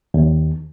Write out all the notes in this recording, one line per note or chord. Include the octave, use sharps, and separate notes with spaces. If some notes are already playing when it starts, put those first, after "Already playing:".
D#2